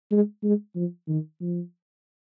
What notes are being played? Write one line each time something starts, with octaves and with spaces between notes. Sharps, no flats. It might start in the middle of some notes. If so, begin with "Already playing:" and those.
G#3
G#3
F3
D#3
F3